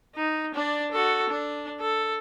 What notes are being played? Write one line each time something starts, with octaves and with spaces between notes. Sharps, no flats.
D#4
D4 D5
F#4 A4
D4
A4